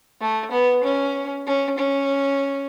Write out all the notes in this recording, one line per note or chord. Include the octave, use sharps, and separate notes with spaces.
A3
B3
C#4
C#4
C#4